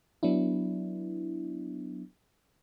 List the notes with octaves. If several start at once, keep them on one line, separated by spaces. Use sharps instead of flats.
F#3 B3 D4 E4